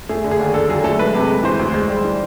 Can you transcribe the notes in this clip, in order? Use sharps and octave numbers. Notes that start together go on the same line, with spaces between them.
A3 G#4
D3
G#4
D#2
D3 A4
F#3 G#4
A3 A4
G#3 B4
C3
G#3
E3 C5
D2
G#3
G3
E3